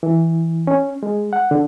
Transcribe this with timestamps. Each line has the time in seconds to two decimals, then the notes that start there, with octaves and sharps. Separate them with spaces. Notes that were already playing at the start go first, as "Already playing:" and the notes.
0.03 E3
0.67 C#4
1.03 G#3
1.33 F#5
1.51 D3